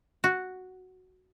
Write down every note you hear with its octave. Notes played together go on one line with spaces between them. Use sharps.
F#4